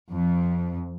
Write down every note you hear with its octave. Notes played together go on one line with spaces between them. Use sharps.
F2